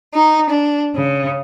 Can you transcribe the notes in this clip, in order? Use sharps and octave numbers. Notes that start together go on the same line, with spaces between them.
D#4
D4
C#3